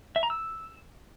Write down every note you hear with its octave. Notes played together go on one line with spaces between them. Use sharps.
E5
A#5
E6